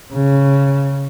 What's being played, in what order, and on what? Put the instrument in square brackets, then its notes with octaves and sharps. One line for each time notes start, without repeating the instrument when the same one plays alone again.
[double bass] C#3